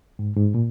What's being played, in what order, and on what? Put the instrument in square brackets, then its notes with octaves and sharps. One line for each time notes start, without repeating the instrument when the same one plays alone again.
[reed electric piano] G#2
G#2
A#2